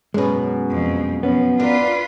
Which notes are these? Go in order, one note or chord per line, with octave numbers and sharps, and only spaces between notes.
F#2 B2 G#3 C#4 B4
F2
F3 B3 C#4
D4 F4 A#4 B4